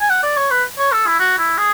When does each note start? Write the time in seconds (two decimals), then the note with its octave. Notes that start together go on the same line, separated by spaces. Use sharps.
0.01 G#5
0.10 F#5
0.23 D5
0.37 C#5
0.51 B4
0.79 C#5
0.92 A4
1.07 E4
1.20 F#4
1.38 E4
1.58 G#4